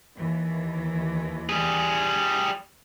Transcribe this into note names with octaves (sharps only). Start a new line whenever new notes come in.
D#2 E3
G3 G#4